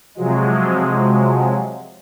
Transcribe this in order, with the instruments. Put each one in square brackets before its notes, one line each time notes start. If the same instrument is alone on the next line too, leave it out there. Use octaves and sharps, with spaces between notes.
[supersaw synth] C3 F3 F#3 G#3